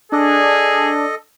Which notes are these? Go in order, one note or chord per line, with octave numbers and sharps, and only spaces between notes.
D4 G#4 A4 D#5